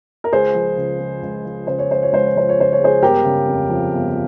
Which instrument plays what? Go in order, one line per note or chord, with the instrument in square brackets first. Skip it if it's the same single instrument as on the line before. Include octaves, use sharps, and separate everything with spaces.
[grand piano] A#4
C#2 G#4 C5
F3
C#3
G#3
C#2
F3
C#3 C5
C#5
G#3 C5
C#5
C#2 C5
C#5
F3 C5
C#5
C#3 C5
C#5
G#3 G#4 C5
G1 G4 A#4
C#3
F2
F3
G1